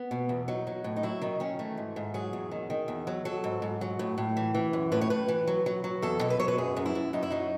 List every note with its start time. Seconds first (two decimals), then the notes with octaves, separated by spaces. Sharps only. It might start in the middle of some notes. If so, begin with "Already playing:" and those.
Already playing: B3
0.11 B2
0.29 E2
0.48 F#3 D#4
0.67 F#3
0.84 A2
0.96 D#4
1.03 F#3 E4
1.22 D#3 D#4
1.40 D#3 C#4
1.59 E3 A3
1.77 G#2
1.96 G#2
2.14 F#3 G#4
2.33 E2
2.51 D#3
2.70 D#3
2.88 E2
3.07 F#3
3.25 F#3 A4
3.44 G#2
3.62 G#2
3.81 F#3
3.99 A2
4.18 A2
4.37 E3
4.55 E3
4.73 F#2
4.92 A2 B4
5.01 C#5
5.10 A2 B4
5.28 E3
5.47 F#3
5.66 F#3
5.84 F#3
6.02 E2 A4
6.21 B2
6.30 B4
6.39 F#3 C#5
6.48 B4
6.58 F#2 G#4
6.77 F#2
6.86 E4
6.95 F#2
7.13 F#2 D#4
7.23 E4
7.30 F#3 D#4